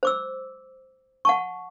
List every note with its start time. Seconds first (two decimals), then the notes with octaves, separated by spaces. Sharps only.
0.03 C5 D6 E6
1.25 F#5 A5 C#6